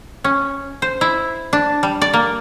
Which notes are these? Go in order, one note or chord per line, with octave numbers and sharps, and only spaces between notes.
C#4
C5
E4
D4
G3
D5
A#3